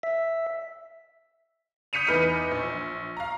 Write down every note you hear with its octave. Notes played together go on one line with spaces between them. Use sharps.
E5
D#6 G6 B6 C#7 D#7 F7
E2 D#4 B4 D#5 F6 B6
A#1
F5 A#5